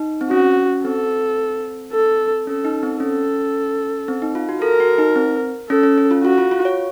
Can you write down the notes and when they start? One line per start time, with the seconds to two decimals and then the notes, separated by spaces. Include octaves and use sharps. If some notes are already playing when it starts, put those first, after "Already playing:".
Already playing: D#4
0.21 C4
0.31 C#4 F#4
0.84 C4 A4
1.93 A4
2.47 C#4 A4
2.65 D#4
2.83 C4
3.00 C#4 A4
4.08 C4
4.22 D#4
4.35 F4
4.49 F#4
4.62 A4 A#4
4.80 F#4
4.98 D#4
5.16 C4
5.70 C#4 A4
5.83 C#4
5.98 C#4
6.11 F4
6.24 F4 F#4
6.38 F4
6.51 F4
6.65 C#5